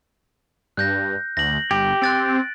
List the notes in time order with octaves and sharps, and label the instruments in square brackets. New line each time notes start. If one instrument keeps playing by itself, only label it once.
[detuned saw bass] G2 [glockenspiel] F#6 G6 A#6
[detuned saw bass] D2 [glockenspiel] A#6 F#7
[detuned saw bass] G1 [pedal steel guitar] G4
[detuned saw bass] C4 [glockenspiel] F#6 A6 D7